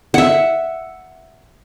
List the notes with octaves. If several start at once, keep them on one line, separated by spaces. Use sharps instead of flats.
E5 F#5